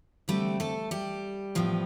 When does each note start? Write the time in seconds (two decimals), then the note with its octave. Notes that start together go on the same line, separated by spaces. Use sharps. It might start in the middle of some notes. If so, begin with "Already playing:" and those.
0.28 D3 G3 A3 C4 G4
0.60 A3 A4
0.91 G3 G4
1.55 A2 F3 B3